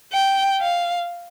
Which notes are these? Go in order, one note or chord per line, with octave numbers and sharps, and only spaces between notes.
G5
F5